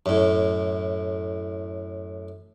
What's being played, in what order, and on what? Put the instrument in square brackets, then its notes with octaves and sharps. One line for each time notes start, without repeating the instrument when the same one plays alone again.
[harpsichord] F#2 A2